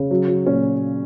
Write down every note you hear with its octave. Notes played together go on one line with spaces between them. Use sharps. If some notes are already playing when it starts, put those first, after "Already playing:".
Already playing: C#3 C#4
F#3
F#3
A#2 C#4